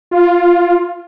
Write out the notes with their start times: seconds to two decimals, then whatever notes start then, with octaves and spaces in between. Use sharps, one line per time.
0.11 F4